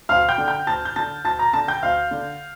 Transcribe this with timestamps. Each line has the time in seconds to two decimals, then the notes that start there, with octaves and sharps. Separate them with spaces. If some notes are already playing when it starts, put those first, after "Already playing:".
0.09 D2 F5 F6
0.29 G5 G6
0.38 D3
0.48 G5 G6
0.67 D2 A5 A6
0.85 G6
0.96 D3 A5 A6
1.25 D2 A5 A6
1.39 A#5 A#6
1.53 D3 A5 A6
1.68 G5 G6
1.82 D2 F5 F6
2.11 D3